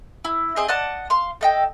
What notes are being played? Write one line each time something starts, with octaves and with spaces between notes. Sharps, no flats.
E4
C4 G#4 D#5
D5 D#5 F#5 A5
F5 C6
A4 D#5 G5